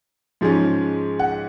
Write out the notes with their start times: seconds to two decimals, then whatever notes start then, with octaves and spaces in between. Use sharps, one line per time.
0.41 G#2 F3 G#3 C#4
1.19 F#5